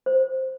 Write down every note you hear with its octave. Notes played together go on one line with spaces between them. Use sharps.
C5